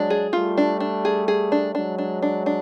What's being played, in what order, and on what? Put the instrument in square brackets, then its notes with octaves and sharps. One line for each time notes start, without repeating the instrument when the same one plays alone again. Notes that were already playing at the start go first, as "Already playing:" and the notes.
Already playing: [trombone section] F#3 G#3 [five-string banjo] D4
[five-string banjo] G#4
[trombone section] G3 A3 [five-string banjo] F4
[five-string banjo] D4
D4
G#4
G#4
D4
[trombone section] F#3 G#3 [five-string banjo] D4
[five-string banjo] D4
D4
D4